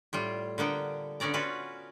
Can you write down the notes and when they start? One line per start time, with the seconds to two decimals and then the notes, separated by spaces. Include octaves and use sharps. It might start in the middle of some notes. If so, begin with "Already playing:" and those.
0.13 A2 G3 F4
0.58 D3 A#3 B3 G5
1.20 D3 B3 C#4 D5 A#5
1.34 C#4 F4 F#4 B4